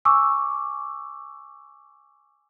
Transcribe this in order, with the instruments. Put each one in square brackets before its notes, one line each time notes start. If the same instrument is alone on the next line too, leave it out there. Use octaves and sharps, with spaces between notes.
[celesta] G#5 C#6 D6 E6